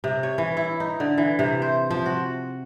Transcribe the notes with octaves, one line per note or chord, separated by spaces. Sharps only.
C3
C#5
E3
E4
D#4
D3
E3
C3
C5
F3
F#4